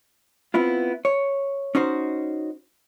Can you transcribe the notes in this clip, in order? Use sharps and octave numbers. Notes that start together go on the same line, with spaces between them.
B3 C4 E4 F4
C#5
C#4 D#4 F#4 C5